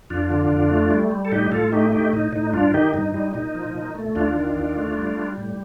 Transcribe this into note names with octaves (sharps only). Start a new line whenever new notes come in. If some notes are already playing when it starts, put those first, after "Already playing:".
F2 D4 F4
D3
F2
A3
G3
G3
A4
A2 D#4 G4
A2 F4 A4
A3 D#4 G4
A3 D#4 G4
A2 D#4
A2 D#4
G2 D4 F4
D#3 D#4 G4
G2 D#4
G3 D#4
A#2 D#4
F3
A#2
A3
D#2 D4 F4
D#3
D#2
A3
G3
G3
A2